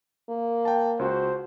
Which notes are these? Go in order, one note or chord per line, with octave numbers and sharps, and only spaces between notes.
A#3
G5 A5
C#2 F#4 C5